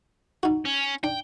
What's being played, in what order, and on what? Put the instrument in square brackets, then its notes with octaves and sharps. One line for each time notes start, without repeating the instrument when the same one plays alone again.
[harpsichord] D#4 F#4
[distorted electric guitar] C#4
[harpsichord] D4 [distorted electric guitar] G5